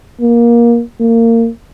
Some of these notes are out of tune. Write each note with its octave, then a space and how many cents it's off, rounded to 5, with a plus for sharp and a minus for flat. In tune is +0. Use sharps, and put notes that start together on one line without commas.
A#3 +20
A#3 -25